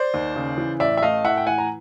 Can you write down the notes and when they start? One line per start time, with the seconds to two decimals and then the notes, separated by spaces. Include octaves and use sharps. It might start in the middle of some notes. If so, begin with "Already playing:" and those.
Already playing: C5 D5
0.14 D#2
0.36 C#3
0.58 E3
0.80 A1 D5 E5
0.97 E5
1.02 A3 D#5 F5
1.25 A2 E5 F#5
1.37 G5
1.47 E3 F#5 G#5
1.58 A#5